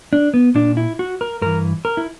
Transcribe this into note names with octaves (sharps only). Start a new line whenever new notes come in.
D4
B3
A#2 D4
E4
F#4
A#4
G2 E3 A#4
A#4
E4